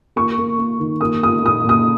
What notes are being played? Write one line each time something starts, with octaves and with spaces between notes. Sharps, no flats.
A#3 C#6
A#3
A#3
D#3
A#3 D#6
A#3 D#6
A#2 D#6
A#2
D#6